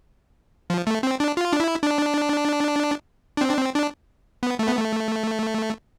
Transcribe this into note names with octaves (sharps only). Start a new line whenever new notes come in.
F3
A3
C4
D4
F4
D4
E4
D4
D4
C4
D4
C4
D4
B3
A3
B3
A3